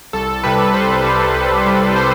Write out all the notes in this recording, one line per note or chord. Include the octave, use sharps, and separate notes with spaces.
C2 A4
C3 G3 B4
C2 C5
C3 G3
C2
C3 G3
C5